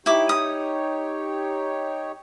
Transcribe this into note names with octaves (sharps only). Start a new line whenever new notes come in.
D#4 E4 G4 C#5 D6
D#6